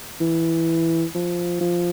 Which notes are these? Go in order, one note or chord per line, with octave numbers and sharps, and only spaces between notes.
E3
F3
F3